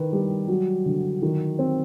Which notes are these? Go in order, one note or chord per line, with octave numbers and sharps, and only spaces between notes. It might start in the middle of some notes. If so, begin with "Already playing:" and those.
Already playing: D#3 B4
G3
F#3
D3
D#3
C4